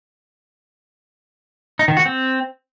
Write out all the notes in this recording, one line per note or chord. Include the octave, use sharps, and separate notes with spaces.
D#4
D#3
F#4
C4